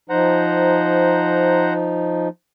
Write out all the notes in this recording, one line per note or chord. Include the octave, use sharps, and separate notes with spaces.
F3 D#4 C5 F#5 A#5